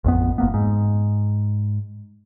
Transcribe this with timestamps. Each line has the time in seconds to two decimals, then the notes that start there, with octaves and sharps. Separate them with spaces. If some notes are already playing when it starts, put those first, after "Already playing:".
0.04 A1 F2 B3
0.38 F#1 A#3 B3
0.54 G#2